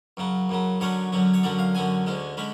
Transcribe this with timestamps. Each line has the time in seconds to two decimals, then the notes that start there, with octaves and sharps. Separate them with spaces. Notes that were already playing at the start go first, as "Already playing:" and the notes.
0.17 F#2 C#3 F#3
0.49 F#2 C#3 F#3
0.80 F#2 D3 F#3 C#4 C#5
1.12 F#2 D3 F#3 C#4
1.34 C#5
1.43 F#2 D3 F#3 C#4 D5
1.59 F5
1.75 F#2 D3 F#3 C#4 G#5
2.06 D2 D3 G#3 C#4
2.37 D3 G#3 C#4 B5